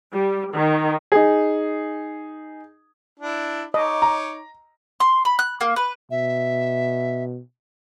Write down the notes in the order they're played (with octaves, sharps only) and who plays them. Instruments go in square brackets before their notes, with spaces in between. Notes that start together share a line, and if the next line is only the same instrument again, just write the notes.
[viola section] G3
D#3
[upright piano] D#4 G#4
[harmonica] D4 E4
[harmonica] D#4 C#5 D6 [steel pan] D#5
[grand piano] A#5
[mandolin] C6
B5
F#6
A#3
B4
[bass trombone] B2 [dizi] E5